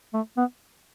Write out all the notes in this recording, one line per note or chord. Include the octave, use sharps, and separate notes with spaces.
A3
B3